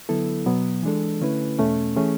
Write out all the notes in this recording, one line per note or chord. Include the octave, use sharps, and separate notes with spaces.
D3 F#3 B3 E4 A4
B2 F#3 B3
E3 G#3 D4 A4
D3 A3 C#4 E4 B4
E2 B2 A3 C#4
E3 A3 C#4 G#4